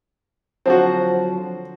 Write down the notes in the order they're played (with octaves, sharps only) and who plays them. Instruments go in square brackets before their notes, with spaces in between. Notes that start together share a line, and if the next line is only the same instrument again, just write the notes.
[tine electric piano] D3 F3 F#3 [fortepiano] C4 F#4